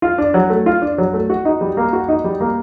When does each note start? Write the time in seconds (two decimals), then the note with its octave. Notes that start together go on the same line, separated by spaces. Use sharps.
0.02 F4
0.18 D4
0.34 F#3
0.50 A3
0.66 F4
0.82 D4
0.98 F#3
1.14 A3
1.30 F#4
1.45 D#4
1.61 G3
1.77 A#3
1.93 F#4
2.08 D#4
2.24 G3
2.41 A#3